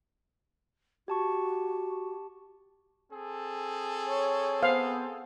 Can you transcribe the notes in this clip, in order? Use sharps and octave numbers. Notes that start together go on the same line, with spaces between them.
F#4 G4 A5 C#6
C4 G#4 A4
C#5
B3 C5 F5